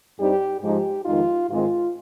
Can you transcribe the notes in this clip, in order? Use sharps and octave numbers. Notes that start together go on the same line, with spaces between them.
G2 G3 C4 D#4 G4
G#2 F3 G#3 D#4 G4
F2 D#3 G#3 D#4 F4
G#2 D#3 G#3 C4 F4